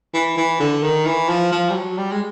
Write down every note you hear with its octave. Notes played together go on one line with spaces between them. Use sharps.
E3
E3
D3
D#3
E3
F3
F3
G3
F#3
G3
G#3